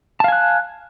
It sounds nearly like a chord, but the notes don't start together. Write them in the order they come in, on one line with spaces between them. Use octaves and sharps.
A5 F5 G#5 F#6